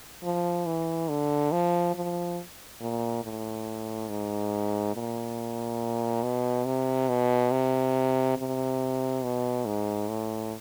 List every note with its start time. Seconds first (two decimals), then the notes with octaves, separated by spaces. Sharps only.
0.23 F3
0.66 E3
1.09 D3
1.52 F3
1.95 F3
2.81 A#2
3.23 A2
4.09 G#2
4.95 A#2
6.23 B2
6.66 C3
7.09 B2
7.51 C3
8.37 C3
9.23 B2
9.66 G#2
10.09 A2